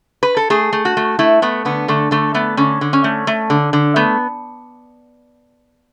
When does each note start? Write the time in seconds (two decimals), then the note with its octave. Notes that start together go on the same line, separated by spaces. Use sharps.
0.23 B4
0.37 A4
0.50 A3 G#4
0.73 A3
0.85 F#4
0.97 A3
1.19 A3 E4
1.42 A3 B3
1.65 D3 B3
1.88 D3 A3
2.11 D3 A3
2.34 A3 B3
2.57 D3 C#4
2.81 D3
2.93 C#4
3.04 A3
3.27 A3
3.50 D3
3.73 D3
3.96 A3 B3